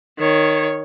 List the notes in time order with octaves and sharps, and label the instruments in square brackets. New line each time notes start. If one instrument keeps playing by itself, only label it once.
[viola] D#3 C#5